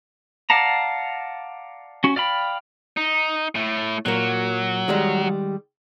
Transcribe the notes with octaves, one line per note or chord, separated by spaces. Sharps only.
D5 F5 F#5 A5 A#5
C#4 F#4
D5 F5 G5 B5
D#4
A2 A3
A#2 F#3 A#3
D#3 G3 G#3